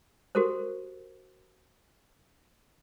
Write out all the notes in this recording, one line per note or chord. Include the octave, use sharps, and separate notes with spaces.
F#4 G4 A4 A#4 C5